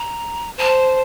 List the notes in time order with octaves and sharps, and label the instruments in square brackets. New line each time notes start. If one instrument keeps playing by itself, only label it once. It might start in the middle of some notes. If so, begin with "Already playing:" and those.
Already playing: [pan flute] A#5
[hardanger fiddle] C5 [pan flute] A5